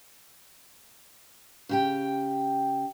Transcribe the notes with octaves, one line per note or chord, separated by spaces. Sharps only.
C#3 G4 G5